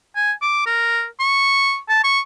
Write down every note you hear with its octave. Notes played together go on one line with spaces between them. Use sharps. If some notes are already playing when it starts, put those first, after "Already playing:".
G#5
D6
A#4
C#6
A5
C#6